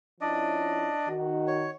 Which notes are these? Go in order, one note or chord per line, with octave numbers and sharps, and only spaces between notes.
F3 C#4 D4 E4 D5 D#5
D#3 F#4
C#5